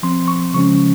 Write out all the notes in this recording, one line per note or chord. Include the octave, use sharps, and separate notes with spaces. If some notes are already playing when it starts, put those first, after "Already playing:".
F3 C4 C6
C#6
C#3 F3 G#3 C#4 C#6